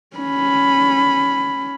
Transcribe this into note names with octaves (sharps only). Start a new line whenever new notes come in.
C#4 B5